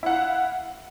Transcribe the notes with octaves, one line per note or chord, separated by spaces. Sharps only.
E4 F5 F#5